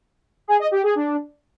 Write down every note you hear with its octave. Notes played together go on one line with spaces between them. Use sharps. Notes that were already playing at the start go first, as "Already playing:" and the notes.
G#4
D#5
G4
G#4
D4